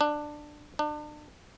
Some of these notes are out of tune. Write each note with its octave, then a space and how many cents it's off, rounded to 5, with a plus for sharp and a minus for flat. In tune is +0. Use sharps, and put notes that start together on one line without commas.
D4 +15
D4 +35